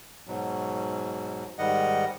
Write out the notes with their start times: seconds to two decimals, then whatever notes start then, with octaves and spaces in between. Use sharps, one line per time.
0.27 G#2 B2 F#3
1.59 G#2 D#3 G3 D#5 F#5